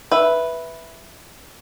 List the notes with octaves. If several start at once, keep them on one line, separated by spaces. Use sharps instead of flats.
B4 E5